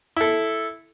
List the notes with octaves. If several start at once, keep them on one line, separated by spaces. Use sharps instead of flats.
E4 A4